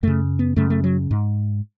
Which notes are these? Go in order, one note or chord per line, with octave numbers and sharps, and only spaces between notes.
F#2 C#3 A3
B3
F#2 C#3 A3
A3
F#3
G#2